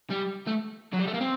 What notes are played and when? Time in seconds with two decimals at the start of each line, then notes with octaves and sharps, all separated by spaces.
0.11 G3
0.47 A3
0.93 F#3
0.99 G3
1.07 A3
1.14 A#3
1.21 C4